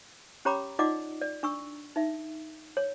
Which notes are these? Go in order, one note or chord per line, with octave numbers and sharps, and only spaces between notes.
C#4 G4 C#5 A#5 B5 D6
D#4 F4 D5 D#5 F#5 D6
D5
D4 C#6 E6
D#4 E5
C#5